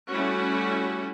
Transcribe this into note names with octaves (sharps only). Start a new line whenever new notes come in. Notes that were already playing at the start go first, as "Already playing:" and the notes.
G3 A3 C#4 E4 F#4